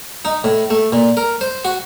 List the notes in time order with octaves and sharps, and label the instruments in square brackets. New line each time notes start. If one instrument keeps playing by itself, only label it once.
[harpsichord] D#4
A2
A3
A#2
A#4
C5
F#4